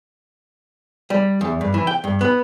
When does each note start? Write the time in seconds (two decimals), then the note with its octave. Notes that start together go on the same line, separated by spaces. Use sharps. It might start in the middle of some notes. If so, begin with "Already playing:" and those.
1.10 G3
1.41 E2
1.61 G2
1.74 E3
1.87 G5
2.04 G2
2.21 B3